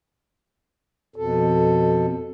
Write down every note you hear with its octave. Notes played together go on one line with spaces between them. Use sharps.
F2 B2 A4